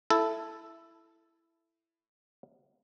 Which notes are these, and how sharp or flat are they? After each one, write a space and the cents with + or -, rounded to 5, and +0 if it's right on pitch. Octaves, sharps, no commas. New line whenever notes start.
E4 +10 A4 +0